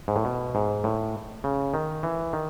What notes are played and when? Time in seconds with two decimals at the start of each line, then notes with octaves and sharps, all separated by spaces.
0.08 G#2
0.16 A2
0.25 B2
0.55 G#2
0.84 A2
1.44 C#3
1.74 D#3
2.03 E3
2.33 D#3